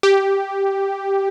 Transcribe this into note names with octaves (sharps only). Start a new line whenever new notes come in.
G4